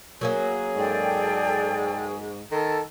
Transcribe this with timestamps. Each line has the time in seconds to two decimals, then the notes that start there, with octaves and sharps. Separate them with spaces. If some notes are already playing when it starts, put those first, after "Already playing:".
0.21 F#3 A#3 C#4 G#4
0.77 G#2 A4 D5 G5
2.51 D#3 A4